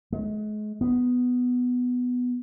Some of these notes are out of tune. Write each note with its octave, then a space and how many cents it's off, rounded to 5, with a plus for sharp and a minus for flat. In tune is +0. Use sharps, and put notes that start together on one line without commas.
G#3 +35
B3 +5